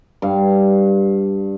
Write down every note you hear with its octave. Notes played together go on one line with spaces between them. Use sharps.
G2 F5